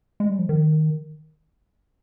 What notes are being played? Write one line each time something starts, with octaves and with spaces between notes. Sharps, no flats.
G#3
G3
F3
D#3